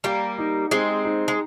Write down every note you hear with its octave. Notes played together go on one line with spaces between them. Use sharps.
G3 A#3 G4
D#4
G#3 C4 D#4
D#4
G#3